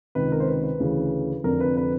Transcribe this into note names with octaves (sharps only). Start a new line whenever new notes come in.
C#2 C3 D#3 B4
A#4
C5
B4
B4
D2 C#3 E3
F1 F2 D3 A#4
B4
B4